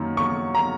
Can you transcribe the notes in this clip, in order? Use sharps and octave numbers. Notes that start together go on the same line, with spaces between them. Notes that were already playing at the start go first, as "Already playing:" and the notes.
Already playing: F#2 D#3 A#3
C#6
A#5